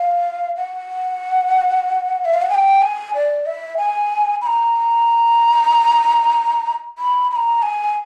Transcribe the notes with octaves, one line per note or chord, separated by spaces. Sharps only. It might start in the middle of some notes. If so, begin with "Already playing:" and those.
Already playing: F5
F#5
E5
F5
F#5
G#5
G5
G#5
D5
E5
G#5
B5
A#5
B5
B5
A#5
G#5